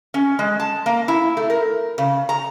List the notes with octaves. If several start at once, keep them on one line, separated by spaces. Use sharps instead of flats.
C#4
G#3
A5
A#3
E4
A3
A#4
C#3
A#5